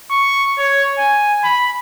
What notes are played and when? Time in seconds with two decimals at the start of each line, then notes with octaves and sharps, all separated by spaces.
0.11 C#6
0.58 C#5
0.99 G#5
1.44 B5